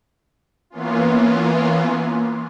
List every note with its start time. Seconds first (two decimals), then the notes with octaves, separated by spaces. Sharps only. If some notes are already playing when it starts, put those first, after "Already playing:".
0.70 E3 A#3 B3 C#4 F4